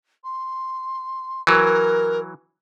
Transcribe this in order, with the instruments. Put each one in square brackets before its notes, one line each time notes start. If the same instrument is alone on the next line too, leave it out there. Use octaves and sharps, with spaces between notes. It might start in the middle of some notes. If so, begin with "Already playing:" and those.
[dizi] C6
[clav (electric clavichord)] E3 F#3 [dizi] A#4